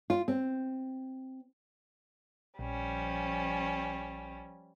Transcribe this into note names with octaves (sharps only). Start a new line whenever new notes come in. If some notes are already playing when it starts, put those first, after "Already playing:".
F4
C4
A#1 F3 G3 C#4